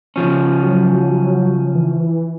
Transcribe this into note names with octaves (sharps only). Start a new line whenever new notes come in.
C#3 F3 C#4
F#3
E3